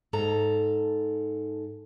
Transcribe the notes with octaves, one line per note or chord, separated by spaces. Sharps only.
G#2 A4 A#5